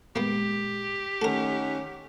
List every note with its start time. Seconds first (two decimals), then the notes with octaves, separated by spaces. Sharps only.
0.16 A#2 G#3 A#3 B3 G4
1.22 D#3 A3 C#4 D#4 A4 A#4 F#5